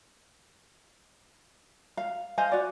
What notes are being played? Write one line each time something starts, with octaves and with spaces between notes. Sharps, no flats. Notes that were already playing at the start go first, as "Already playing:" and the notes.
F5
C5 D#5 F5 G#5
F#4 D5